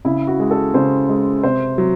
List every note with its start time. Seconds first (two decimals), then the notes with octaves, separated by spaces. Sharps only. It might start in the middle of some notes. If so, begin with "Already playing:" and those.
0.05 C#3 E4
0.27 F#4
0.40 G#3
0.51 A4
0.74 C#3 C5
1.09 G#3
1.43 C3 C5
1.78 F#3